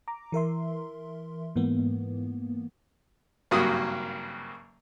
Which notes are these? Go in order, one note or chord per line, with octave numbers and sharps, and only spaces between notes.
A#5 D6
E3 A#4 E5 C6
G#2 E3 A#3 B3
G#1 G2 C#3 F#3 A#3 D#6